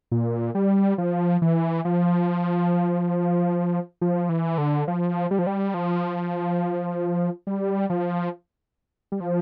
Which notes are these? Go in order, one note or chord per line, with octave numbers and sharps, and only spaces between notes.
A#2
G3
F3
E3
F3
F3
E3
D3
F3
G3
F3
G3
F3
G3
F3
G3
F3